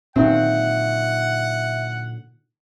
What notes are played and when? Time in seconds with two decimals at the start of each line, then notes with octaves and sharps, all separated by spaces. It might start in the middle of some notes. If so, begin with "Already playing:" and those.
0.16 A#2 D3 D#3 F#3 C4 E5 F#5